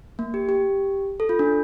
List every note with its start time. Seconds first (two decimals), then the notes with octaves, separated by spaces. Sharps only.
0.19 A#3
0.34 G4
0.49 G4
1.20 A4
1.29 F4
1.39 D4